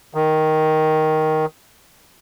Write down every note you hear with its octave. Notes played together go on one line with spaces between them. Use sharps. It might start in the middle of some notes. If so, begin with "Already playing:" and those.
D#3